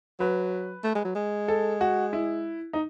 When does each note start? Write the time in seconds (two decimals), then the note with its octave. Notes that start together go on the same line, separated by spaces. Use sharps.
0.20 F#3 B4
0.84 A3
0.95 G#3
1.05 F#3
1.15 G#3
1.48 A4
1.81 F#4
2.13 E4
2.73 D#4